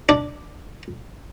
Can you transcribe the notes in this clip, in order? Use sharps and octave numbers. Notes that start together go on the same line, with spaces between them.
D4